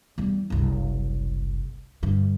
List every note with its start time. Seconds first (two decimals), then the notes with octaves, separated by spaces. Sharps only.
0.18 E2 G3
0.50 F#1 C2
2.03 G2 D3